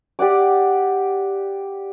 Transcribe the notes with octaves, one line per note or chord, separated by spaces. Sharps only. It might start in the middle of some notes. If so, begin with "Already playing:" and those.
G4 D5 F#5 D6